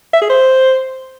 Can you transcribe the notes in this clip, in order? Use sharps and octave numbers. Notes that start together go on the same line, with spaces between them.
E5
G#4
C5